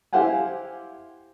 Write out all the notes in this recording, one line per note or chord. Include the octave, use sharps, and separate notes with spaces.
E4 G4 C5 F5 F#5 G#5